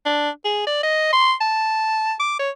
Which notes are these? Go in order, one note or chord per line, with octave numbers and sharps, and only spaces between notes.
D4
G#4
D5
D#5
C6
A5
D6
C#5